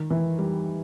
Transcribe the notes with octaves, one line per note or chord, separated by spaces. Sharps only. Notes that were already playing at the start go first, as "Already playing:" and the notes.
Already playing: D#3
E3
G3